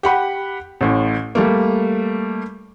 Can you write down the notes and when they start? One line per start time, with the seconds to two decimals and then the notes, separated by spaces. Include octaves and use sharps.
0.03 G4 F#5 B5
0.81 A1 A2
1.35 G3 A3 A#3